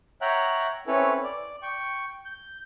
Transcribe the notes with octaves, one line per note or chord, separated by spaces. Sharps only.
C#5 E5 F#5 G5 A#5 F#6
C4 C#4 E4 A4 B4 C#5
D5
G5 C#6
G6